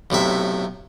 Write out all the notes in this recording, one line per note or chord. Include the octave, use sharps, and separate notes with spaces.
B1 A2 C3 E5